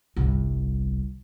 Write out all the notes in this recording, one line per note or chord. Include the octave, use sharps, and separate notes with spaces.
G1 C2